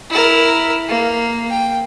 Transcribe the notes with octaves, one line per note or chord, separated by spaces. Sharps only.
E4 A#4
A#3
G5